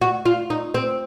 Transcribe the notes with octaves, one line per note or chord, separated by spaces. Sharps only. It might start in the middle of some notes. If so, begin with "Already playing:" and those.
F#4
F4
D#4
C4